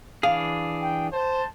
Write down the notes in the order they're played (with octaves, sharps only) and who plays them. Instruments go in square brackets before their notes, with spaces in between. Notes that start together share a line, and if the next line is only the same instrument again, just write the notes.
[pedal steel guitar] E3 D4 G#4 [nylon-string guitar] F5
[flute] G5
[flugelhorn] C5 [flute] A5